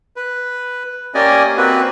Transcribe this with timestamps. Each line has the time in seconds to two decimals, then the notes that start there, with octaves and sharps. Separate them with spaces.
0.16 B4
1.14 A#3 C#4 G4 D5 D#5 G#5
1.57 A#3 C4 F#4 B4